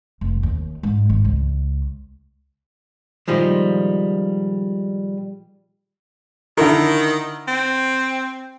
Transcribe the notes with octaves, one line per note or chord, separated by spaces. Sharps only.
F1
D#2
G#2
G#1
C#2
A#2 D#3 F3 G3 G#3
D3 D#3 E4 A#4
C4